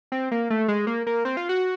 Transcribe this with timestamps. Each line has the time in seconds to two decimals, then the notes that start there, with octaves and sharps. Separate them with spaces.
0.12 C4
0.31 A#3
0.50 A3
0.68 G#3
0.87 A#3
1.07 A#3
1.25 C4
1.37 F4
1.49 F#4